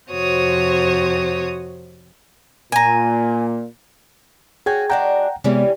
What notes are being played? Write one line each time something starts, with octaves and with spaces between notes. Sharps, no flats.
F2 C3 F#4 C5 C#5 D#6
A#2 G#5 A#5
C#4 F#4 G#4 G5 G#6
G#3 D4 F#4 F#5 G5 A#5
C3 E3 G3 G#3 B3 C#4